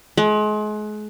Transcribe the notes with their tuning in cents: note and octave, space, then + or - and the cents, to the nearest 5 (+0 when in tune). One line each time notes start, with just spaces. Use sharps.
G#3 +35